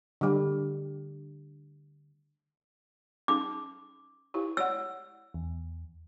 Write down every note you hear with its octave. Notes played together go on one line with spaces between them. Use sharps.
D3 G3
C#4 D#4 G#4 D6
E4 G4
C#5 D5 F#5 E6
E2